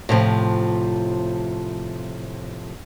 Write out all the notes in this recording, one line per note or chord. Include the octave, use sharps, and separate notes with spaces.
A2 C3 D#3 F3